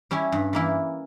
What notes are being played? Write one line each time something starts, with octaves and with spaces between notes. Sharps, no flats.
G3 C#4 E4
G2
E3 A#3 E4